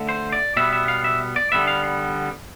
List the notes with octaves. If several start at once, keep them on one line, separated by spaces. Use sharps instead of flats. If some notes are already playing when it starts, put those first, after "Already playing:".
Already playing: D3 A3
C5
D5
B2 G3 B3 E5
E5
F5
E5
D5
D3 G3 B3 E5
F5